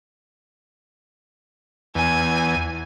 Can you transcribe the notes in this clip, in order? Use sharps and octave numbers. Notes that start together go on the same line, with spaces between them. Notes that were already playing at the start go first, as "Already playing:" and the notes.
E2 G#5